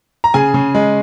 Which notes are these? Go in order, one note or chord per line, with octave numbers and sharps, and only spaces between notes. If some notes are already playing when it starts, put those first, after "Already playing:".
A#5
C#3 G#4 G#5
C#3
G#3